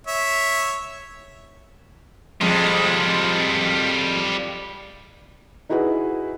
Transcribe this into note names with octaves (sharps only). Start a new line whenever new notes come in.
C#5 E5
F2 G3 G#3 F4
D#4 E4 F#4 G#4 B4